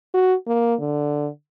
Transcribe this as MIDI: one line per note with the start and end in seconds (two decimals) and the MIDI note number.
0.14 0.34 66
0.47 0.75 58
0.80 1.29 50